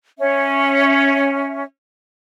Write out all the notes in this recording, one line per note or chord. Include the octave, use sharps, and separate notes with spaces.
C#4 E5